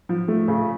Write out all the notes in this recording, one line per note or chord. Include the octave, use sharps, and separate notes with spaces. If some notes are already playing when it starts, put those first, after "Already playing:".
F3
A3
C#3